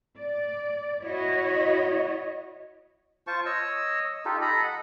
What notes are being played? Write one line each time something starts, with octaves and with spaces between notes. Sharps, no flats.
D5
E4 F#4 C#5 D#5
F4 C5 A5 C#6
C#5 D#5 E6
D#4 F4 G4 A4
A4 D#5 A#5 B5
F#5